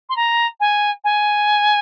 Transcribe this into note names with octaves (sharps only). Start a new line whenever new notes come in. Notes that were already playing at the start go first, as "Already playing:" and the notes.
C6
A#5
G#5
G#5